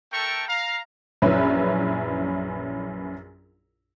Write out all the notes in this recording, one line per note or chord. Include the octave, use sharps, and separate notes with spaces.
A3 A4 A#4 G5 C#6
F5 A#5
A#1 F#2 C#4 E4 B4 E5